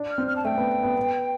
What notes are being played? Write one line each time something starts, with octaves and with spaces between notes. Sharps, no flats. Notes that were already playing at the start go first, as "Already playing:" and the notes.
Already playing: D4
F6
C4
F6
A5
A3 G5
B3
B3
B3